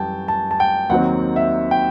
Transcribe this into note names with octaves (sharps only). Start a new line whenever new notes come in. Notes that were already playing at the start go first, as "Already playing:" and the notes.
Already playing: F#2 E3 G3 G5 A5
A5
A5
G5
D#2 D#3 F#3 C4 F#5
E5
G5